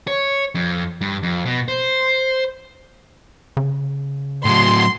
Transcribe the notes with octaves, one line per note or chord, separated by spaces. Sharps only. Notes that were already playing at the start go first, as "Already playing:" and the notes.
C#5
F2
G2
F2
B2
C5
C#3
A2 F#3 C6